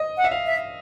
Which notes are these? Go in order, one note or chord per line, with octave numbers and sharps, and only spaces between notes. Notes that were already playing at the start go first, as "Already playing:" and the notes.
Already playing: D#5
F#5
E5
F5
E5